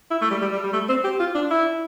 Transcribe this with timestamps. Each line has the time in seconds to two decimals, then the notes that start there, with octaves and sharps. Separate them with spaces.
0.11 E4
0.21 A3
0.31 G3
0.42 G3
0.52 G3
0.63 G3
0.73 A3
0.89 C4
1.04 G4
1.20 F4
1.35 D4
1.50 E4